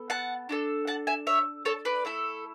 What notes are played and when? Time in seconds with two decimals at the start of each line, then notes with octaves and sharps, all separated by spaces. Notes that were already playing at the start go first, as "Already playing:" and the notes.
Already playing: B3 A4
0.10 F#5 A5
0.49 D4 F#4 A4
0.87 F#5 A5
1.07 E5 G#5
1.27 C#5 E5
1.65 A4 C#5
1.85 B4 D5
2.05 A3 E4 A4